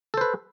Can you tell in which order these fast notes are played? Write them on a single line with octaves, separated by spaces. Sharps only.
A4 C5 B4